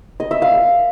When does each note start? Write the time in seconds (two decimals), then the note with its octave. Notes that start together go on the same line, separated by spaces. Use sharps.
0.20 D#5
0.31 E5
0.42 F5